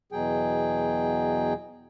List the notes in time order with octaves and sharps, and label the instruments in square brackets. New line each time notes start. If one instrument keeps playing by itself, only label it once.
[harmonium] E2 B2 F#3 G#4 G5